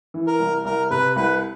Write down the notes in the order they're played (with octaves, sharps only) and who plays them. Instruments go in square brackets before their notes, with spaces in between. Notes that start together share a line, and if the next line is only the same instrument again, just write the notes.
[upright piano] E3
[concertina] A#4
[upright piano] C2
[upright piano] C2 [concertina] A#4
[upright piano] C3 [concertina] B4
[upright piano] C2 [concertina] B4